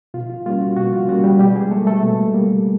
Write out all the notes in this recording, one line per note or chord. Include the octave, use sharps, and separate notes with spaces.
B2 F4
F4
G3 A#3 C#4 F4
F#4
B2 F#4
F4
G3 A#3 C#4 F#4
G3 G4
B2 G3 G4
G#3 G#4
G3 A3 A#3 A4
A3 A4
B2
G3 A#3